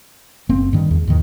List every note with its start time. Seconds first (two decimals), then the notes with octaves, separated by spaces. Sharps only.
0.49 F#1 A#3 C4 C#4
0.73 G2 D#3
0.91 E2
1.08 D#2 G#2 D#3 E3